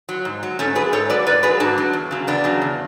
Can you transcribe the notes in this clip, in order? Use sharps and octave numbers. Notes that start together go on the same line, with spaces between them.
F#3
G#2
F#3
G#2 A3 C#4
F#3 G#4 B4
G#2 A4 C#5
F#3 B4 D5
G#2 B4 D5
F#3 G#4 B4
G#2 D4 F#4
F#3
E2
C#3 F#3
E2 B3 D4
C#3 F#3
E2